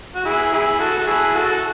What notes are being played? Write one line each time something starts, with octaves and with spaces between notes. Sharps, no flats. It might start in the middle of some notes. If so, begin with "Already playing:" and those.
F#4
E4 G#4
E4 G#4
F#4 A4
A4
E4 G#4
F#4 A4